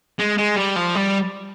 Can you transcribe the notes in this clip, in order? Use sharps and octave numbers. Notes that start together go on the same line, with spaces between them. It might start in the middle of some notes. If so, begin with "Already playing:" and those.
G#3
G#3
G3
F3
G3